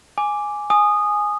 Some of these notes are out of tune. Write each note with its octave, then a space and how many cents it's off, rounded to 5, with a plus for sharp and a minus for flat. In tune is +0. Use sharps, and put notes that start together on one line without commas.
G#5 +0 D6 +0
G#5 +5 D#6 -15